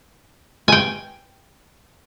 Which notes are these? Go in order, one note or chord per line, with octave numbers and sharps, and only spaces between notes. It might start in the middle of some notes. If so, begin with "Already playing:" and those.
G5 G#5